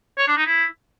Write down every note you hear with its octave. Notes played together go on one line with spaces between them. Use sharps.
C#5
D4
D#4
E4